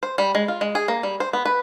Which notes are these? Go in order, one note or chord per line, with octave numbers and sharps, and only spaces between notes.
C5
G3
G#3
F4
G#3
G#4
A#3
G3
C5
B3
B4